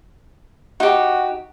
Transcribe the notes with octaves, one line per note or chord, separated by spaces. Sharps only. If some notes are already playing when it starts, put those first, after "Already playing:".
D#4 F#4 G4